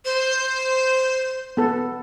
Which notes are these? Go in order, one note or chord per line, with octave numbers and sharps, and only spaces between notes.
C5
B3 A4